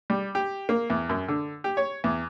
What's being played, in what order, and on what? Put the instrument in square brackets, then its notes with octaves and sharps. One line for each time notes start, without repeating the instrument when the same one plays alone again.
[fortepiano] G3
G4
A#3
E2
F#2
D3
G4
C#5
E2